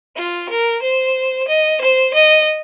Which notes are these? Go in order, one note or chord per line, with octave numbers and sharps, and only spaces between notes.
F4
A#4
C5
D#5
C5
D#5